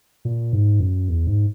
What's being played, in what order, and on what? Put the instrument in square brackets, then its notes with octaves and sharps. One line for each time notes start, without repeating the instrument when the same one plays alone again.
[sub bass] A#2
G#2
F#2
E2
G#2